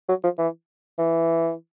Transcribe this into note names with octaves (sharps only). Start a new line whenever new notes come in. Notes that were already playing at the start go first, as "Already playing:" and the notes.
F#3
F3
E3
E3